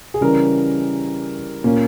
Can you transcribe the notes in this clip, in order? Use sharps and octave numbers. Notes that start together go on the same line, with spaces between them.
G#4
C#3 E3 G3 C#4 A#4
A#2 A#3 C#4